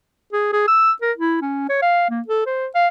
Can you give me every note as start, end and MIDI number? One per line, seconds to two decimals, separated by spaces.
0.33 0.51 68
0.53 0.64 68
0.68 0.91 88
1.02 1.12 70
1.18 1.37 64
1.42 1.68 61
1.69 1.82 73
1.82 2.06 77
2.10 2.21 58
2.28 2.43 69
2.47 2.67 72
2.75 2.88 77